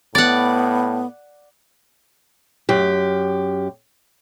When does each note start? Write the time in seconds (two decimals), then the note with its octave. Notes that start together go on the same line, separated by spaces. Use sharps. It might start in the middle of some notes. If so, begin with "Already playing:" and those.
0.15 A2 B3 D5 F#5
2.69 F#2 G4